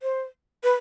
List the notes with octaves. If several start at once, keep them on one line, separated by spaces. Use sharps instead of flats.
C5
B4